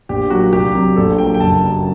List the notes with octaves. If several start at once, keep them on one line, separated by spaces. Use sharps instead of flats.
A#1 G4
A#2 F#3 F#4
C2 G4
C3 F#3
A#1 A4
A#2 F#3 G5
G5
F#1 A5
F#2 F#3